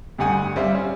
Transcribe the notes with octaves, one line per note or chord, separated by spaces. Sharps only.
D2 G2 G4 F#5 G#5 D#6
G3 C#4 C5 E5 F5
C#4